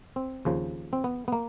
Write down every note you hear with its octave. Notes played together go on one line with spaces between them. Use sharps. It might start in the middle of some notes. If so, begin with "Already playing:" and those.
C4
D#2 C#3 F3
C4
B3
B3
A#3